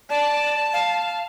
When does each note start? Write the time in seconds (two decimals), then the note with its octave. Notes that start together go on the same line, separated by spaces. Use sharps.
0.10 D5 A5
0.73 F5